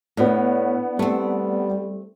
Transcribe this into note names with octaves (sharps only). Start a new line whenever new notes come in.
A2 B3 D4
G3 A3 C4